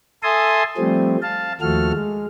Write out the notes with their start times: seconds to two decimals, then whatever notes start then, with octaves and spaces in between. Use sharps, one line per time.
0.23 A4 E5 G#5 A5 C6 D#6
0.77 F3 G3 A3 C4
1.22 F5 A5
1.61 D#2 F3 A3 F#4 A4 F6
1.93 G#3